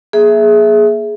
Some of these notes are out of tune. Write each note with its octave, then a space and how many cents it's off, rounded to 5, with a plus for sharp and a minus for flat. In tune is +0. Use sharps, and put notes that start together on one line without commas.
A#3 +20 G#4 +15 E5 +0